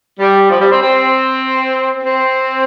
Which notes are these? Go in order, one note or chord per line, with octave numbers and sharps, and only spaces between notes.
G3
F3
G3
C4
C4
C4